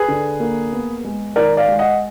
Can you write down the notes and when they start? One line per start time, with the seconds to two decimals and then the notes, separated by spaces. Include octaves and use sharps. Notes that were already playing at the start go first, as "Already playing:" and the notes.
Already playing: G#4 B4
0.08 D3
0.40 A#3
0.72 B3
1.04 G#3
1.36 D#3 A#4 D5
1.57 D5 F5
1.68 G#3
1.79 D#5 F#5